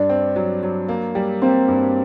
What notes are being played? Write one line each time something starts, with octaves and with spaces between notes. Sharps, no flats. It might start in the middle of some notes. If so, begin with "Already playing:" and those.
Already playing: G2 D4
C4
F#3
F#3
A#3
G3
A#3 C4
G2